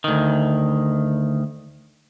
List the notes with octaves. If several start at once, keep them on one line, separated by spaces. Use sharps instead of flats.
D2 D#3